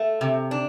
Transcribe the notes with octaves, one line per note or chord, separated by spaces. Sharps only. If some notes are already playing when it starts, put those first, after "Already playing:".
Already playing: A3
C3
D4